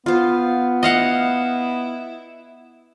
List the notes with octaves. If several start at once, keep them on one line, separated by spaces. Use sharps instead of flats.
B3 F4 C5 F5
E4 D#5 F5 F#5